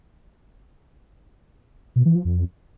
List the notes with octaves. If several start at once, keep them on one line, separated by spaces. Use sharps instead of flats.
B2
E3
F3
F2